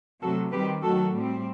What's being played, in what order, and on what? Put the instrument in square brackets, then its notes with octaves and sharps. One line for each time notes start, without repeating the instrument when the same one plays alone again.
[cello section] C3 F#3 A3 F#4 A4
D#3 G3 C4 G4 B4
D#3 F#3 A3 F#4 A4
A2 G3 C4